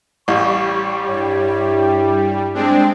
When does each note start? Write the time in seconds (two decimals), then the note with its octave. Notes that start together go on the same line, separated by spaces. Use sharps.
0.28 A1 G3 C#6
1.07 G2 E4 G4 C#5
2.54 G#3 C4 D4 G5